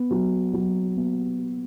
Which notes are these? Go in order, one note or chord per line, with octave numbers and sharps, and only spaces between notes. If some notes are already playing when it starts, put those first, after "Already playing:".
Already playing: B3
F#3
F#3
B3